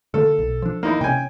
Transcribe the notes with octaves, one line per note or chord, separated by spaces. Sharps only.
D3 A3 A#3 A4
B1
F3 D4
A#3 D#4 E4
C3 C4 C#4 G5 G#5